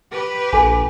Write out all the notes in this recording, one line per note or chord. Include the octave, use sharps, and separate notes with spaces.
G4 B4
A#1 A4 G#5